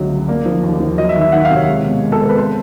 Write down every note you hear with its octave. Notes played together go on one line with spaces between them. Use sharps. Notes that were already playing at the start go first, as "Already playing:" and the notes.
Already playing: C#2 D3 F#3 A3
F#3
A#3 D5
F3
D#2
F3
F#3 D#5
E5
D#3
E5
D#3 F#5
F5
C3
C#5
G#3
B2
G#3
A4
C4 A#4
B4
C5